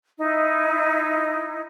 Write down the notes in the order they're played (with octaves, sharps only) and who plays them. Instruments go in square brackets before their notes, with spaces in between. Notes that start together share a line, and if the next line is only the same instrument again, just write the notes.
[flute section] D#4 E4